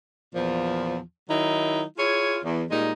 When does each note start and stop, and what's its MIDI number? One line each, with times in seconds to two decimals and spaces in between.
0.34 0.97 40
0.34 0.97 46
0.34 0.97 53
1.29 1.82 51
1.29 1.82 54
1.29 1.82 63
1.29 1.82 64
1.97 2.38 64
1.97 2.38 65
1.97 2.38 68
1.97 2.38 73
2.44 2.63 40
2.71 2.92 46
2.71 2.92 55
2.71 2.92 56
2.71 2.92 63